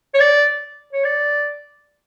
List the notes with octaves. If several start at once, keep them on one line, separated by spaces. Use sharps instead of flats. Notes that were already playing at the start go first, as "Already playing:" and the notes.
C#5
D5
C#5
D5